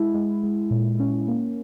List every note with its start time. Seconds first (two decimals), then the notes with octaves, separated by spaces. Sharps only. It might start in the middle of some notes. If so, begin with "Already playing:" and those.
Already playing: G#3 E4
0.14 G#3
0.43 G#3
0.70 A#2
0.99 C#4
1.28 A#3